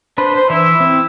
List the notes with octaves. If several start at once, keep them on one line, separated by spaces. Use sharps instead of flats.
D4 B4 C5
C5
E3 E4 E5
C4